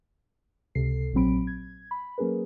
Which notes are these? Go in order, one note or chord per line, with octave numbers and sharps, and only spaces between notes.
C#2 C3 A4 C7
A#1 A#2 F#3 C4 B5 D7
G#6
B5
F#3 A#3 C#4 G#4 A#4 B4